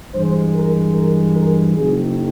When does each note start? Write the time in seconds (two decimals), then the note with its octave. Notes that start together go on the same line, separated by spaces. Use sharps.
0.14 G2 E3 G#3 C5
0.55 A#4
0.94 A#4
1.36 A#4
1.76 F#1 F#2 D#3 G#4